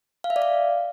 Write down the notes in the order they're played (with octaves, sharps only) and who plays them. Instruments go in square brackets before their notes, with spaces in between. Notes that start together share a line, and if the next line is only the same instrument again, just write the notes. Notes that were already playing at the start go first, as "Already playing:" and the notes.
[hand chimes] F5
E5
D5
F5